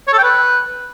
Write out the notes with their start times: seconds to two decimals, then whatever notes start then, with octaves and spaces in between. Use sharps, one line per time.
0.07 C#5
0.13 A4
0.18 G5
0.23 B4